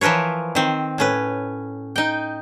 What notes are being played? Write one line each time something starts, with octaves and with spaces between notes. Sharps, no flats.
E3 F3 A#4 B4 C#5
D#3 C4
A2 C#4 B4
D#4 G5